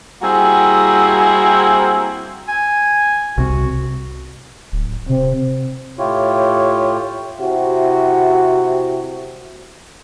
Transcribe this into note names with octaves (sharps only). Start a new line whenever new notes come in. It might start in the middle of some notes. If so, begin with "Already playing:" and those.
G3 A#3 C4 E4 F#4 G#4
G#5
C2 C3 F#4
D1
C3 C4
A2 E4 F4 G4 C#5
C3 E4 F#4